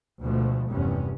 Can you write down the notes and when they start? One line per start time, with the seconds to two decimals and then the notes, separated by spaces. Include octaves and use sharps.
0.21 D2 B2 F3 G#3 A3
0.69 F1 E2 G2 C3 B3 C#4